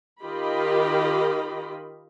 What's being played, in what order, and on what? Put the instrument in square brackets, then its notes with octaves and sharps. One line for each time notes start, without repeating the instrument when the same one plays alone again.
[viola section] D#3 F4 G4 A#4 D#5 B5